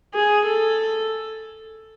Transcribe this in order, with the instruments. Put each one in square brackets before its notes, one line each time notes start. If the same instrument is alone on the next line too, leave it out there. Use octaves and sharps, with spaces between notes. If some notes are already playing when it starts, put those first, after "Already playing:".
[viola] G#4
A4